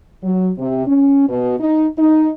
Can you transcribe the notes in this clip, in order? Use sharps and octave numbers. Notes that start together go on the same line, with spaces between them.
F#3
C3
C#4
B2
D#4
D#4